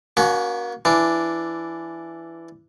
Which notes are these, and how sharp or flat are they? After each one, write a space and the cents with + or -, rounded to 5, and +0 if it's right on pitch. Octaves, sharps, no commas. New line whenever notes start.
A#3 +30 C#4 +40 F#4 +0
E3 +15 D4 +0